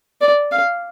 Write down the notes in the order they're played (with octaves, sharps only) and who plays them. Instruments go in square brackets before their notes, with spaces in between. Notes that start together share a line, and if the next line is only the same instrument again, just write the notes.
[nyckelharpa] D5
F5